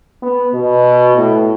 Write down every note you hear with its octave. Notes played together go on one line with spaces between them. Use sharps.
B3
B2
A2